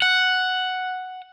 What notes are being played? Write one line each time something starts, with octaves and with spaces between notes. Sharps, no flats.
F#5